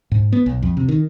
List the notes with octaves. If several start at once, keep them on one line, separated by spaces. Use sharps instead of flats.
G#2
B3
B1
F2
C3
D#3